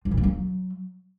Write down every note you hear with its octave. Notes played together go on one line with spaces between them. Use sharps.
F3
A#2
A#3
F#3